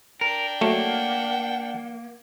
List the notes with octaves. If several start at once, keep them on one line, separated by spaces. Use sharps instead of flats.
D4 A#4 G5
F#3 A3 A#3 F#5